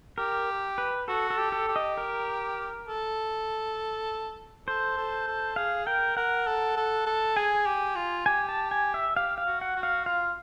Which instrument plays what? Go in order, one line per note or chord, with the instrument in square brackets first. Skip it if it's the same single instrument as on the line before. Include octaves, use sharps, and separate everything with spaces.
[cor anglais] G4 [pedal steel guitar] A#4
[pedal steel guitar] B4
[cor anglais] F#4 [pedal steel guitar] A4
[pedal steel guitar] A4
[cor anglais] G4
[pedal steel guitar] A4
[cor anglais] G4
[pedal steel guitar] D#5
A#4
[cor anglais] A4
[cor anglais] A4 [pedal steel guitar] C5
[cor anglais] A4
A4
[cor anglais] G#4 [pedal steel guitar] F5
[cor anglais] A#4 [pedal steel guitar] G5
[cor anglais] A#4 [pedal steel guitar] F#5
[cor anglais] A4
A4
A4
[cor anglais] G#4 [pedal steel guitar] G#5
[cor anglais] G4
F4
[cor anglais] G4 [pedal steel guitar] G#5
[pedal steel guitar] A5
G#5
E5
[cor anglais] G4 [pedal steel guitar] F5
[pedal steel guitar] F5
[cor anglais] F#4
[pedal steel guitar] F#5
[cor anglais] F#4
[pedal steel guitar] F5
[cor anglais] F4 [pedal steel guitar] F5